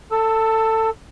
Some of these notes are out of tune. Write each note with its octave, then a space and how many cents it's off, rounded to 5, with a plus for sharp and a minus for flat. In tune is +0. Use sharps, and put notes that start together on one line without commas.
A4 +20 E6 +0